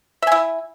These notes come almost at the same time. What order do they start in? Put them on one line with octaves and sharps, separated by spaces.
E5 G#5 E4